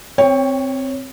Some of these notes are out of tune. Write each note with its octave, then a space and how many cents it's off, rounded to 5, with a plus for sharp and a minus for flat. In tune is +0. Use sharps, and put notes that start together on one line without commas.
C4 +0 C#5 +0 G5 +30